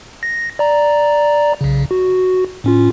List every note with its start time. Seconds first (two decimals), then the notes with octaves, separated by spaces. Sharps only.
0.23 A#6
0.59 D5 A#5
1.61 B1 C#3
1.91 F#4
2.64 A2 C#4 F4